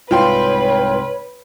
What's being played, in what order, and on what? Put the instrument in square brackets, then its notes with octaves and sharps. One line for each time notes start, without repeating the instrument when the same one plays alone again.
[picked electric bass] C2 G#2 [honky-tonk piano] F4 G5 C6 [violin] B4 [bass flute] C#5